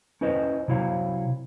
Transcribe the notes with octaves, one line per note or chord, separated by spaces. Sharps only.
C#4 E4 B4 C5 D#5
C3 F#3 E4 C#5 F5